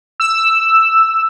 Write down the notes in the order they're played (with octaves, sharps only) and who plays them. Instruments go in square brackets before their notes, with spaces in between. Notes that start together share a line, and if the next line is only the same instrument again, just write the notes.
[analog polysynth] E6